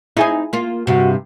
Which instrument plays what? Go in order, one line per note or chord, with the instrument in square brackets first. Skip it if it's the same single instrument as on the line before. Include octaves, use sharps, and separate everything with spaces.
[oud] C4 D#4 [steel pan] E4 G#4 G#5
[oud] A#3 F4
[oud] G2 C3 [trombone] F#4